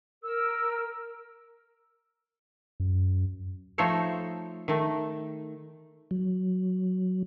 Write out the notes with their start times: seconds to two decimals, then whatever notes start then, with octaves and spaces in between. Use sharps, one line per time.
0.24 A#4 E6
2.80 F#2
3.78 F3 A3 D#4 A4 C5 C#5
4.68 D#3 A3
6.11 F#3